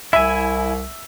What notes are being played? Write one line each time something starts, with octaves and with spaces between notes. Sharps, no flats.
C2 E4 E5 G#5